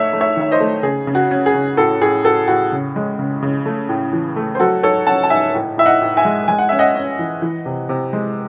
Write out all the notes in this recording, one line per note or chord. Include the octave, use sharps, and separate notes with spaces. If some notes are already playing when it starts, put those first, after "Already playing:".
Already playing: G#2 A3 C#5 E5
A3
C#5 E5
D#3 E5
C5 D#5
A3
C#3 G#4
C#3
F#4
C#4
G#4
C#3
A2 F#4 A4
A2 G#4
A2 F#4 A4
A2 F#4
C#3
G#3
C#3
C#3
A3
A2
E3
A3
C5
F#3 F#4 A4
G#2 A4 C#5
C#4 F#5 A5
A5
G#2 E5 G#5
A2
A2 E5
D#5 F#5
A2
E5 G#5
G#3
G#3 G#5
F#5
C#4 E5
D#5 F#5
C#4
E3
E3
C3
C3
G#3